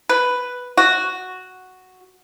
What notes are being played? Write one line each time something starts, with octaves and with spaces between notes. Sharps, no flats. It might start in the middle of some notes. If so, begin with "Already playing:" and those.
B4
F#4